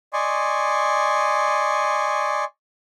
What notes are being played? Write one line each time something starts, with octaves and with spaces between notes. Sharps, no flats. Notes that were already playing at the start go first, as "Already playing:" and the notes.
D5 D#5 G#5 C6 C#6